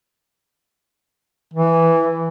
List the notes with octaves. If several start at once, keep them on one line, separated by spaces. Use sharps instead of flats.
E3